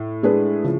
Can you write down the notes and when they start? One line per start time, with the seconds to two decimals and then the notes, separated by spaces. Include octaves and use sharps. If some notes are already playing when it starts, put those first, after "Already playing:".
Already playing: A2
0.23 G#3 D4 G#4 B4
0.64 C#3 F3